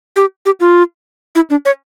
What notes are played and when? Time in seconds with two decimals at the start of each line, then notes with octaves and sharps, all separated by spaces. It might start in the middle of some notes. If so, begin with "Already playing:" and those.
0.16 G4
0.46 G4
0.60 F4
1.35 E4
1.50 D4
1.65 C#5